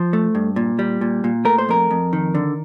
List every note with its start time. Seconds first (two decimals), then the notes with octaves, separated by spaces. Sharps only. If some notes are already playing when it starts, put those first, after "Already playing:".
Already playing: F3 C5
0.13 A3
0.35 G2
0.56 A#2
0.79 G3
1.01 A#2
1.24 A#2
1.45 A3 A#4
1.58 C5
1.68 F2 A#4
1.91 F2
2.13 D#3
2.35 D3